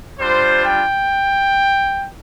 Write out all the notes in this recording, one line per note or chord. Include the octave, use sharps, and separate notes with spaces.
G3 D4 F4 C5
G5